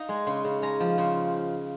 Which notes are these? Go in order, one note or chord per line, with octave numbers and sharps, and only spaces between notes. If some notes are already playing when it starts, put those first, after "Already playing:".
Already playing: D#4 D#5 F5 A#5
G#3
C#3 C6
C#3
G#3 A#5
F3
C#3 C5